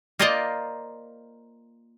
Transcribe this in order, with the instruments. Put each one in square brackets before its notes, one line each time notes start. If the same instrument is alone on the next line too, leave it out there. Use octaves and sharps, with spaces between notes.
[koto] A#3 F4 A#4 C5 D5 D#5